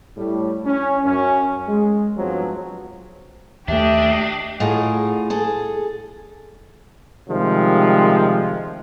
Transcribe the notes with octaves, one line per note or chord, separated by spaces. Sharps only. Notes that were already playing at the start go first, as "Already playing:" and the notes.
A2 G3
C#4
F#2 C#4
G#3
G2 F3 F#3 G#3 B3 C4
D#2 A3 D4 G4 D#5 E5
A2 F4 G#4 D#5 F#5
G#4 A4
C3 D#3 F3 G3 G#3